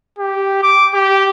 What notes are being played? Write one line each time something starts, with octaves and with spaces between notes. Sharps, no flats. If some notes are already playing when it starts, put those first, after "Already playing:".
G4
D6
G4